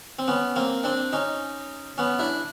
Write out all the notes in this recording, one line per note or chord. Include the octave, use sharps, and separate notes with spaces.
C4
B3 C#4
A#3 C4
C4 D4
C#4 D#4
B3 C#4
D4 E4